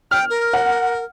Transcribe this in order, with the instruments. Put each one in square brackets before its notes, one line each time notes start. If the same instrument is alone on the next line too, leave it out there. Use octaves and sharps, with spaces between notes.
[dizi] G5 [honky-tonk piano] F6
[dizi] A#4
[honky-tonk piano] F#5